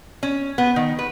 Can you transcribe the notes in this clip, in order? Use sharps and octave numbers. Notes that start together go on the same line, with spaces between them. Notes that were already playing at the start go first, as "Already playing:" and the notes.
C#4
B3
D#3
B4